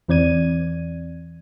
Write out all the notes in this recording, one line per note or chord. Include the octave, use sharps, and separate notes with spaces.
E2 E3 C4 D5 G#6 D#7